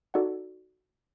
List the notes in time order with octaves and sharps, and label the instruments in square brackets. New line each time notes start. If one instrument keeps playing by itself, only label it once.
[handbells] D#4 F#4 A4 D5 F#5